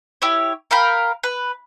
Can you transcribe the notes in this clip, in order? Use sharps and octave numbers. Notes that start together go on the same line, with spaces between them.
E4 G4 C#5
A#4 F5 G5 B5
B4